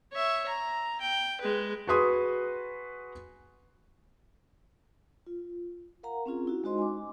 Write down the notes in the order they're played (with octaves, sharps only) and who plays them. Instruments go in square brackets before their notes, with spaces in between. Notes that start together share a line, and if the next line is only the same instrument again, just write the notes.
[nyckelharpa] C#5 E5
A#5
G5
G#3 B4
[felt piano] F#4 G#4 B4 C6 D#6
[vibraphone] F4
A#4 F5 F#5 A#5
C4 C#4 F4 G#4
E4 F#4
G#3 D#4 F#4 C5 D#5 C6
G#5 D6